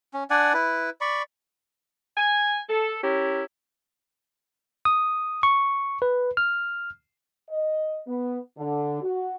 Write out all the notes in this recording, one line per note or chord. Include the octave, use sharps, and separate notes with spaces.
C#4
D4 D5 F#5 G#5
E4 B4
D5 B5 C#6
G#5
A4
C#4 E4 G4 A#4
D#6
C#6
B4
F6
D#5
B3
D3
F#4